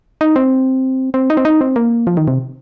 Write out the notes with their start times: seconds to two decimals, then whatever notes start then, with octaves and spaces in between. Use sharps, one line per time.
0.21 D#4
0.36 C4
1.14 C4
1.30 D#4
1.37 C4
1.45 D#4
1.61 C4
1.76 A#3
2.07 F3
2.17 D#3
2.28 C3